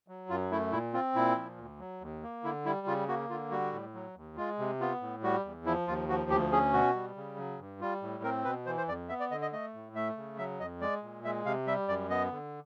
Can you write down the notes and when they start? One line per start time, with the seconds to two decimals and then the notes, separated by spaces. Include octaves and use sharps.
0.08 F#3
0.29 F#2 F4
0.51 A3 E4
0.72 A#2 E4
0.93 C4 F4
1.15 A#2 E4
1.37 F3
1.58 D2
1.80 F#3
2.01 D#2
2.23 A#3
2.44 D3 E4
2.65 G3 E4
2.87 C#3 F4
3.08 A#3 F#4
3.29 D3 F4
3.51 G3 F#4
3.73 A2
3.94 F#3
4.16 D#2
4.37 G#3 F4
4.59 C3
4.80 B3 F4
5.01 A2
5.23 G3 F#4
5.45 E2
5.65 F3 E4
5.87 D#2 F4
6.09 F3 F#4
6.30 D2 G4
6.52 C#4 G#4
6.73 B2 F#4
6.95 G3
7.16 C#3
7.38 F#3
7.59 G2
7.81 G3 F4
8.02 A2
8.24 C4 A#4
8.45 B2 B4
8.66 E3 C5
8.77 C5
8.88 F2 D5
9.09 B3 E5
9.20 D5
9.31 D3 D#5
9.42 D#5
9.52 A3 D#5
9.74 A2
9.95 A3 E5
10.17 C#3
10.38 F#3 E5
10.60 F2 D#5
10.81 G#3 D5
11.03 A#2
11.24 G#3 E5
11.46 C3 F5
11.67 G3 E5
11.88 F#2 D5
12.10 B3 D#5
12.32 D3